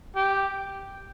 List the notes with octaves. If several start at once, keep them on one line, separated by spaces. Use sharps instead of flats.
G4